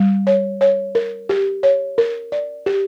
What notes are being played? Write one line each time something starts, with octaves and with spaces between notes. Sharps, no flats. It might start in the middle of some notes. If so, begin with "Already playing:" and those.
Already playing: G3
C#5
C#5
A#4
G4
C#5
A#4
D5
G4